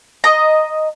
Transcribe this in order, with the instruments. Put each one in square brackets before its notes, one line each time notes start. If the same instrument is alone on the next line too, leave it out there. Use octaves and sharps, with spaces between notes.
[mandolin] D#5 A#5